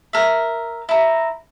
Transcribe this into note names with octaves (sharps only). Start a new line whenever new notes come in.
A#4 E5
E4 A#5